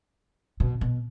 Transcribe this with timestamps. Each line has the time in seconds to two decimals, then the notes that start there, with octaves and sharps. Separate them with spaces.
0.60 B2
0.81 B2